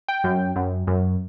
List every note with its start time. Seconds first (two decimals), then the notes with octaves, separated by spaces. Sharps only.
0.08 G5
0.24 F#2
0.56 F#2
0.87 F#2